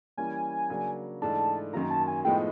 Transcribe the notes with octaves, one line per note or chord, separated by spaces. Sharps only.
E3 G3 A#3 C#4 G#5
C#3 F#3 A#3 D4
G#2 E3 A3 D4 A5
F#2 D#3 F#3 A#3 A#5
A5
G#5
A2 F3 G#3 B3 D#4 G5